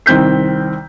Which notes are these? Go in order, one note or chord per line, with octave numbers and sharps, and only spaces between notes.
C2 D#3 C4 G6 B6